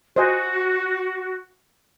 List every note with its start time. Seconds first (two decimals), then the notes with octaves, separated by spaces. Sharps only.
0.16 F#4 C5 D#5 G#5